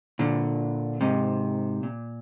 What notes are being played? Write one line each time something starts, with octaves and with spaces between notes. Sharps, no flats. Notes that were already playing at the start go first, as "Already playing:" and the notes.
A#2 D3
G#2 C3
A#2